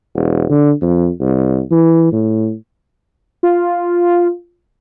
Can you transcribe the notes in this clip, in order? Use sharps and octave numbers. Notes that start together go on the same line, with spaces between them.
E1
D3
F2
C2
E3
A2
F4